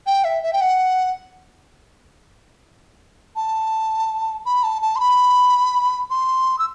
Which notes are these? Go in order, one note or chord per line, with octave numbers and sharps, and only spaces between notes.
G5
E5
E5
G5
F#5
A5
B5
A5
A5
C6
B5
C6
E6